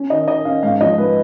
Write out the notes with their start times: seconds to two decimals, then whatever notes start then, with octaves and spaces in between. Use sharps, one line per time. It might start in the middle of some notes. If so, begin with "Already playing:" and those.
Already playing: C#4
0.10 D#3 D#5
0.28 D#3 D#5
0.45 C#4 F5
0.63 G#2 F5
0.80 F3 D#5
0.98 G#2 B4